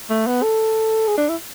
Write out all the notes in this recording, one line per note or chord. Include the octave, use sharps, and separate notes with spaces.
A3
B3
A4
G#4
D4
E4